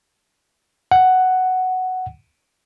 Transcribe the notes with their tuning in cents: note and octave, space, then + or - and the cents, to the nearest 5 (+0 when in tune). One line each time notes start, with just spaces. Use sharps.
F#5 +5